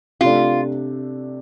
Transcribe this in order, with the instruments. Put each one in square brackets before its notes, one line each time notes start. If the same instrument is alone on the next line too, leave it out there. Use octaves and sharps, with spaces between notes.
[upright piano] C3 A3 D4 [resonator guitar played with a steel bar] F4